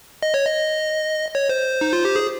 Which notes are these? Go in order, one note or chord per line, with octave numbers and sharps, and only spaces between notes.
D#5
C#5
D#5
C#5
C5
D#4
F4
G4
G#4